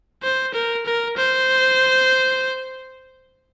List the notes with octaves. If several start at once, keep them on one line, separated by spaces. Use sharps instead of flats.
C5
A#4
A#4
C5